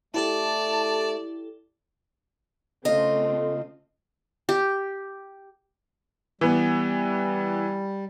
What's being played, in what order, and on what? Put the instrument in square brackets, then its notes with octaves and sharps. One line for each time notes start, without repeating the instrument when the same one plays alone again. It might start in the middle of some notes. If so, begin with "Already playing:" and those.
[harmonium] A3 [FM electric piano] E4 G4 A4 [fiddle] D5 [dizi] A5
[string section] C#3 A3 C4 [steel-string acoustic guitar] F4 D#5
[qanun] G4
[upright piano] E3 B3 [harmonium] G3